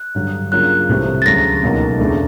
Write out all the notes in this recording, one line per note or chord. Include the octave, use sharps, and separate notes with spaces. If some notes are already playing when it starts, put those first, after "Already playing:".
Already playing: F#6
G2 D3 F#3
C#3 F#3 A#3 D4 F4 F#6
C2 C3 E3 A3 C4
A6
D2 C#3 F#3 A3 A#6
C#2 B2 F#3 A#3 D#4
E2 C#3 E3 A3 D4